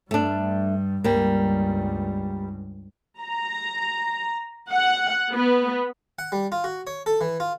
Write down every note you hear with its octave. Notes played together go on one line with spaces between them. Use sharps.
G2 G3 A3 D4
C#2 G2 G3 A#3
A#5
F#5
B3
F#5
G3
F4
F#4
C#5
A4
E3
F4